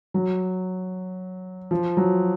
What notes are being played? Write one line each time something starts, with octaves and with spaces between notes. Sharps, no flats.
F#3
F3
F#3